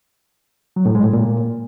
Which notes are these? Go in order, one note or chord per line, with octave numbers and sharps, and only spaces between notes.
F#3
A2
G#3
A2
A#2